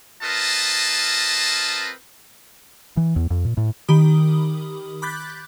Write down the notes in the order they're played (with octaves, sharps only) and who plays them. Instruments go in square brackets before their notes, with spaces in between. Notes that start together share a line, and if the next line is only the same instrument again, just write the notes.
[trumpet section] C4 F4 A#4 B4 D#5 A5
[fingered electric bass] E3
E2
F2
A#2
A2
[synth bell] D#3 G4 B5 D#6
B5 D6 F#6 G6 A6 B6